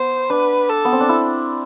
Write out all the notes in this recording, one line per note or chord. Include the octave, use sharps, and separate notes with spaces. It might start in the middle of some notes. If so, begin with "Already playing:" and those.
Already playing: B3 C5
D4 B4
A4
B3
C4
D4
E4